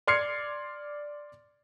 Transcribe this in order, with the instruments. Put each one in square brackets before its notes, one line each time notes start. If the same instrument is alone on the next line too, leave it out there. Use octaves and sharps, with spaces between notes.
[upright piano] D5 C6 F6 G#6 C7 C#7